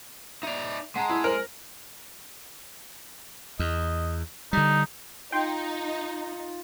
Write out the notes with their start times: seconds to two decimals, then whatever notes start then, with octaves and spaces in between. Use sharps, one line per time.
0.43 D#4 D5 E5 F7
0.96 G#3 F#5 A5 A#5
1.09 E4
1.24 A#4 C5 F6 F#7
3.59 E2 D#5
4.53 D3 G3 D#4
5.32 D#4 F4 G5 C6 G6